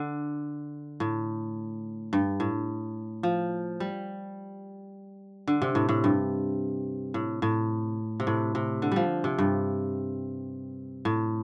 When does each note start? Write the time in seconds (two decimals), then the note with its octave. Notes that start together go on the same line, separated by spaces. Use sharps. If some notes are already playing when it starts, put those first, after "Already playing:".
Already playing: D3
1.00 A2
2.13 G2
2.40 A2
3.23 F3
3.80 G3
5.47 D3
5.62 C3
5.75 A2
5.89 A2
6.04 G2
7.14 A2
7.42 A2
8.20 C3
8.27 A2
8.55 C3
8.82 D3
8.92 F3 G3
9.24 C3
9.38 G2
11.05 A2